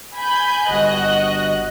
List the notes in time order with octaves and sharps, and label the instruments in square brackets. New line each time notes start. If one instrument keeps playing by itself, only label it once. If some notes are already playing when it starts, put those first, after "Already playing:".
[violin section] G#5 B5 G6
[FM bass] G1 [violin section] F#4 D#5 F#6